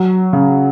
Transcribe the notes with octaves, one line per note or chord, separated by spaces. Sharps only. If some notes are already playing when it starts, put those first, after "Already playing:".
Already playing: F#3
C#3